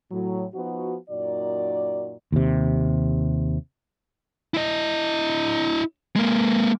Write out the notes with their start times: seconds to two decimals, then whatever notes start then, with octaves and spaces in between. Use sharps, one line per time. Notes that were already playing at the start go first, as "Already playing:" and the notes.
0.10 A2 F#3
0.54 F3 B3 D#4 F#4
1.10 F#2 A#2 D#4 F#4 D5
2.32 D#2 C3
4.54 E4 D#5
6.16 G#3 A#3